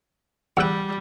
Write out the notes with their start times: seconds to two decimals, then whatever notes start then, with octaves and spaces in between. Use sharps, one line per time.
0.57 E2 G3 F#5 G5 E6 F#6